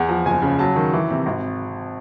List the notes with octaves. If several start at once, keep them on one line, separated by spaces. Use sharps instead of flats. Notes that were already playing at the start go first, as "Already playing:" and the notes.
Already playing: E2 F#5
F3
F#1 G#5
C#3
F#3 A5
D#3
E3
C3
G#1